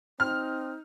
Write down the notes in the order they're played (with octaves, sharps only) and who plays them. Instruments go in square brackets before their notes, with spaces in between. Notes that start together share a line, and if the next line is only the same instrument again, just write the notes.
[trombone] C4 [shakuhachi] D#4 [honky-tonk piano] F6